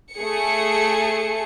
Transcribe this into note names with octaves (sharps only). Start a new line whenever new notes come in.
A3 G#4 C#7